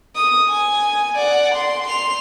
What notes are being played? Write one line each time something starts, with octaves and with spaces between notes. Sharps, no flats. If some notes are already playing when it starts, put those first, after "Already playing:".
D#6
G#5
D5 F#5
C6
C6 F7